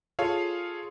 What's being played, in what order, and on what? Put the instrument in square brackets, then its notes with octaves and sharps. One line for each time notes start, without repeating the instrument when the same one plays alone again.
[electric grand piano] F4 G#4 A4 C#5 F5